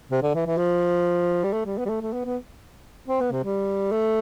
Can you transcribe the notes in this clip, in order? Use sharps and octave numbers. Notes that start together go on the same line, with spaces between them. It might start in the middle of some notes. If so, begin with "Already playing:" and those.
C3
D3
E3
E3
F3
G3
A3
G3
B3
G3
A3
A3
B3
B3
C4
B3
C3
G3
A3